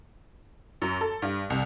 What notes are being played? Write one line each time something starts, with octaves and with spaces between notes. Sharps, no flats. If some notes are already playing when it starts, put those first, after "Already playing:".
F#2
A4
G2
C2